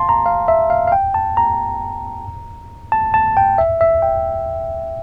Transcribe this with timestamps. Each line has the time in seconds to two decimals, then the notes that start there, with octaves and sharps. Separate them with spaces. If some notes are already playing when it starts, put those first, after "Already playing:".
Already playing: F5 A5 C6
0.09 A#5
0.26 F5
0.48 E5
0.70 F5
0.87 F5
0.92 G5
1.14 A5
1.37 A#5
2.92 A5
3.14 A5
3.37 G5
3.58 E5
3.81 E5
4.02 G5